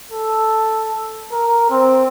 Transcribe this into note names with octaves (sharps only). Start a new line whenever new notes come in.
A4
A#4
C4